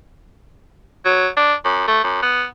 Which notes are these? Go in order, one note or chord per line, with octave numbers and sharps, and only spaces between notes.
F#3
D4
F#2
A3
F#2
B3